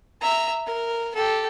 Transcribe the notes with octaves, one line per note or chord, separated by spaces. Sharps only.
E5 A#5
A#4
G4 A4